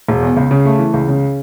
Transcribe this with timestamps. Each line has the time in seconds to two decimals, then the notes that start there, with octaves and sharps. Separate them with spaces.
0.09 E1
0.22 E2
0.37 C#2
0.51 C#3
0.65 A3
0.79 E3
0.94 C#2
1.08 C#3